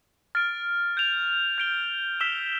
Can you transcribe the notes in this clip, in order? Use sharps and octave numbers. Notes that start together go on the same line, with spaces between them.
F6 A6 D7
G6 D7 F7
G6 D7 G7
E6 B6 E7 G7